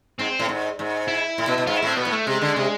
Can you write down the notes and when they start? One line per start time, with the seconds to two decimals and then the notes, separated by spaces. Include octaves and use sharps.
0.19 G#2 C4
0.39 A2
0.49 G#2
0.79 G#2
1.08 E4
1.38 A2
1.47 B2
1.58 B2
1.67 G#2 F4
1.77 E4
1.83 A2 C4
1.97 B2 B3
2.07 A2
2.13 A3
2.27 C3 G#3
2.42 D3
2.56 C3